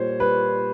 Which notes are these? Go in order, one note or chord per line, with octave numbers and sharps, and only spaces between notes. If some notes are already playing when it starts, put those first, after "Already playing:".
Already playing: A#2 G3 A#3 C5 C#5
G3 B4